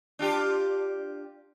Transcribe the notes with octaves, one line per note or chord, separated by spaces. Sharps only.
D4 F4 G4